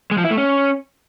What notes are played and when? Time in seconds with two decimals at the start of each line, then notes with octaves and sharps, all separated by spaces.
0.11 G#3
0.18 F3
0.24 E4
0.31 A3
0.37 C#4